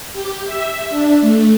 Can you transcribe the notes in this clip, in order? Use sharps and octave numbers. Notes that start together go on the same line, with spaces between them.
G4
E5
D4
A3